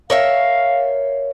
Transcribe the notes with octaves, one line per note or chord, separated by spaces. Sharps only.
A#4 C#5 E5 F5